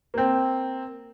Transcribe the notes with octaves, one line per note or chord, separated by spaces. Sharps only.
A#3 C4